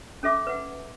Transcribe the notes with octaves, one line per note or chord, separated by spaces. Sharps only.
C#4 A4 E5 D6
B4 F#5